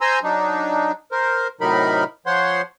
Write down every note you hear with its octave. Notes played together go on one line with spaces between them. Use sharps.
C5 G#5 A#5 C6 E6
F#3 D4 D#4
A#4 C5
A2 C3 F#3 D#4 A#4 B5
F3 C5 C#5 F#5 C6